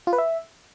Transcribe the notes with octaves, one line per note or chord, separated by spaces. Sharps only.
F4
B4
E5